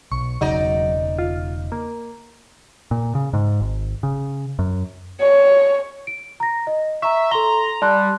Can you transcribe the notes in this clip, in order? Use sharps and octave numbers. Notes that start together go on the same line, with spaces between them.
B1 C#6
E1 C#3 F#3 D#4 D5 D#5
F4
A#3
A#2
C#3
G#2
G#1
C#3
F#2
C#5
D7
A#5 A#6
D#5
E5 A#5 C#6
A4 A#5 C6 G7
G3 A5 C6 F#6